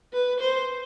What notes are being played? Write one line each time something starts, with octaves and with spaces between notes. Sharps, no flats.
B4
C5